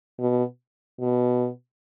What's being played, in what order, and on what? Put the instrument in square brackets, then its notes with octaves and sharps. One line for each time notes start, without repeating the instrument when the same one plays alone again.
[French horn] B2
B2